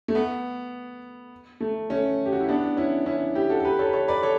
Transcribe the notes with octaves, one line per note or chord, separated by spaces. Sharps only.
A3
B3
A3
A3 C#4
G4
F#4
E4
B3 D4
C#4 E4
C#4 E4
E4 G4
F#4 A4
A4
G4 B4
A4 C#5
B4
A4 C#5
B4 D5
A4 C#5